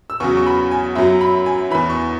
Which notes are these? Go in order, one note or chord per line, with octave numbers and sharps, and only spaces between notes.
E6
E2 C#3 F#3 C#6
C#6
B5
G#5
F#2 F#3 E5
B5
G#5
E2 E3 B5
C#6